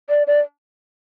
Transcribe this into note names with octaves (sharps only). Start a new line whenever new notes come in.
D5
D5